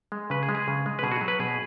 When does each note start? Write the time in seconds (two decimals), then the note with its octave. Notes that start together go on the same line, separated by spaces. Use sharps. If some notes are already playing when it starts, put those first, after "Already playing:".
0.12 G#3
0.30 C#3 B4
0.43 G#4
0.49 G#3
0.55 G#4
0.68 C#3
0.86 G#3
0.99 B4
1.03 B2 G#4
1.12 F#4
1.15 G#4
1.21 F#3
1.28 B4
1.40 B2 G#4